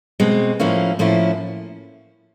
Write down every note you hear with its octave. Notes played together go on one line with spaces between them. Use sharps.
B2 G#3 C4
A2 F3 A#3 C#4 E4
A2 F3 A#3 C#4 E4